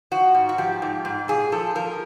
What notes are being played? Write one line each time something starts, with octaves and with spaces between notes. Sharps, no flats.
F3 F#4
G#2
F#4
F3 G4
G#2
G#2
A#2 G#4
F3 A4
F3 A#4